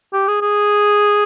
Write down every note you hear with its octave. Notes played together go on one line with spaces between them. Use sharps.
G4
G#4
G#4